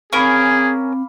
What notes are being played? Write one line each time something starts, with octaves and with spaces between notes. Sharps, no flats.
C4 C#4 G#4 A#4 F5 B5 D6